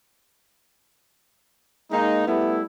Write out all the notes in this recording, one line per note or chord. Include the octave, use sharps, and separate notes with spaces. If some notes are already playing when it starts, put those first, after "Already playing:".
G#3 A#3 D#4
G3 A3 B3 E4